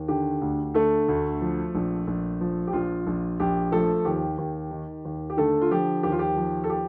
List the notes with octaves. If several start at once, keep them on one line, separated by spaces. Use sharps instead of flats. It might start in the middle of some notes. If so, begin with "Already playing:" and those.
Already playing: D#2
D3 G4
D2
D3 A3 A4
D2
F3
A#1
A#1
F3
G4
A#1 F4
A#1
A#1 G4
F3 A3 A4
D#2 G4
D#2
D#3
D#2
G4
D3 A3 A4
F4
F3 G4
D#2 G4
F4
G4
F3
A4
G4